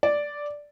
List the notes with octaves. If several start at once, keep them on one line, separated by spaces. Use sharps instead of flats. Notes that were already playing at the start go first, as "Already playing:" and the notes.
D5